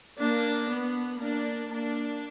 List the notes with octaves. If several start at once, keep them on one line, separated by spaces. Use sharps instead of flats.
A#3 D4
B3
A#3 D4
A#3 D4